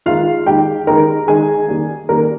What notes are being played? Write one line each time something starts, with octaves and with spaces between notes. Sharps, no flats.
D#3 G#3 D#4 F4 F5
D#3 G#3 D#4 G4 G5
D#3 G#3 D#4 A#4 A#5
D#3 G#3 D#4 G#4 G#5
D#3 G3 A#3
D#3 G3 A#3 A#4